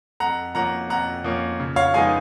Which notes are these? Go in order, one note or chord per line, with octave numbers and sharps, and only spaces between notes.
F2 F#5 A#5
F3 A#3 C#4 F#5 A#5
F2 F#5 A#5
F3 A#3 C#4
C#3
C#5 F5
F3 G#3 B3 D#4 F5 G#5